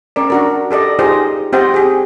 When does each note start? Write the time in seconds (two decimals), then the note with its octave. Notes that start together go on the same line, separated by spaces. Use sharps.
0.16 C#4 A#4 D5
0.30 D4 F#4 A#4
0.71 G4 A4 D5 D#5
0.99 D#4 F4 G4 G#4 C5 D#5
1.53 C4 G4 C5 D#5 F#5 G5
1.74 G4 G#4